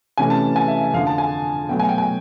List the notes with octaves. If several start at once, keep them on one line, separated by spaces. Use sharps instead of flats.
C3 E3 A3 C#4 G#5
A5
G#5
E5
E5
F2 D3 F3 F5
A5
G#5
B2 F#3 A3 G5
G#5
G5
G#5